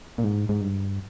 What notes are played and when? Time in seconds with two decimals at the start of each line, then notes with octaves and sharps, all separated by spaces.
0.18 A#2
0.24 G#2
0.49 G#2
0.61 G2